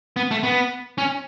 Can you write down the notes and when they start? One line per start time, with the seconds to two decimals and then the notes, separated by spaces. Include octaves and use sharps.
0.16 B3
0.31 A3
0.43 B3
0.98 C#4